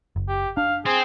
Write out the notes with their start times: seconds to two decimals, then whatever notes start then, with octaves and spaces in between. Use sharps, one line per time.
0.16 F#1
0.28 G4
0.57 D4 F5
0.86 C4 G#4